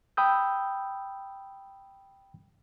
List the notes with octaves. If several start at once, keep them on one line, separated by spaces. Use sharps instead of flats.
G5 B5 D#6 E6 G6